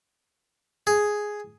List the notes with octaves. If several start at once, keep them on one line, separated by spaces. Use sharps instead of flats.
G#4